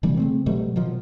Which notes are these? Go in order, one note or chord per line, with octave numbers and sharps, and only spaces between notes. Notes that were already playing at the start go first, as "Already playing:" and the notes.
C3 E3 G3 A#3
C#3 A3 C4
B2 F#3 G3 A3
B2 D#3 F3 F#3